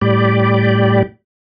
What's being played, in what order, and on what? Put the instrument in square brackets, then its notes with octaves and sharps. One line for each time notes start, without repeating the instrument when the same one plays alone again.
[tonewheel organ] A2 G3 G4 D5